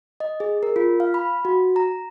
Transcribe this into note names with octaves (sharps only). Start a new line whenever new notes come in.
D#5
G#4
A#4
F4
F5
B5
F#4
A#5